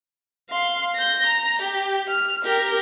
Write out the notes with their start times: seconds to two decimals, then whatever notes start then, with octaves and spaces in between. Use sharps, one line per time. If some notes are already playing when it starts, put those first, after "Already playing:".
0.49 F5 C6
0.96 G6 A#6
1.26 A#5
1.62 G4
2.09 F6
2.44 G4 A#4